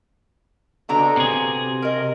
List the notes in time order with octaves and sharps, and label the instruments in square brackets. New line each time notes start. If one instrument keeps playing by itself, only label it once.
[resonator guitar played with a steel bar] B2 D3 A#5
[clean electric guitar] C3 G#4
[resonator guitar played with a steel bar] A#4 D#5